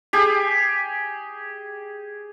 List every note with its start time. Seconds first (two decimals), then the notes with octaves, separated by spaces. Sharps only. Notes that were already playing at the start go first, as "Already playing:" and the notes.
0.13 G4 G#4